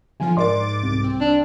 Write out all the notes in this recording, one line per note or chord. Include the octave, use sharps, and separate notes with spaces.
D3 F3 F4 G#5
G#2 A#4 D5 C6 D6 A6
C2
C4
D4